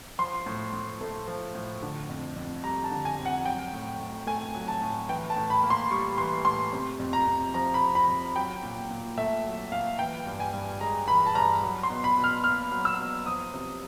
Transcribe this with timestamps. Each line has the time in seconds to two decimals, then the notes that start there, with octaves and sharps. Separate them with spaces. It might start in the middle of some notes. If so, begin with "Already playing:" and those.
0.18 F3 C6
0.46 A2
0.73 A2
1.01 A3
1.28 F3
1.55 A2
1.82 D3
2.09 F2
2.36 F2
2.64 G3 A#5
2.84 A5
2.91 D3
3.05 G#5
3.19 F2
3.25 F#5
3.45 F#3 G5
3.73 A2
4.00 A2
4.27 A3 G#5
4.54 F#3
4.68 A5
4.82 A2
5.09 E3 G5
5.30 A5
5.36 A2
5.50 B5
5.63 A#3
5.70 C6
5.91 G3 C#6
6.18 E3 C6
6.45 A2 C6
6.73 C3
6.99 F2
7.13 A#5
7.27 F2
7.54 F3 A#5
7.74 B5
7.82 C3
7.95 B5
8.08 F2
8.36 F#3 G5
8.63 A#2
8.91 A#2
9.17 A3 E5
9.44 F#3
9.72 A#2 F5
9.99 E3 G5
10.26 G2
10.40 G#5
10.54 G2
10.81 G#3 A#5
11.08 E3 B5
11.26 A5
11.35 G2 A#5
11.63 F#3
11.83 C6
11.90 B2
12.04 B5
12.17 B2
12.24 F6
12.44 A#3 F6
12.71 F#3
12.85 E6
12.99 B2
13.26 F3 D#6
13.54 C3